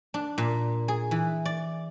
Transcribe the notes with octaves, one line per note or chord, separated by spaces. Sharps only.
D4
A#2
G#4
E3
D5